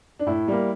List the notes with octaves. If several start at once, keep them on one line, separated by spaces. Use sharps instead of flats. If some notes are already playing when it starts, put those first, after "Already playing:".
D4
A2 E4
G3 A#3